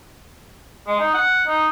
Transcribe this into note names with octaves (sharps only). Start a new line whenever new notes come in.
G#3
D#4
F#5
D#4